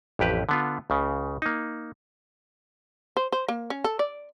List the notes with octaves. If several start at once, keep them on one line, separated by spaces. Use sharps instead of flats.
A1 F2 G4 B4
D3 B3 F4
C#2 C#3
A#3 D#4
C5
C5
A#3
C#4
A4
D5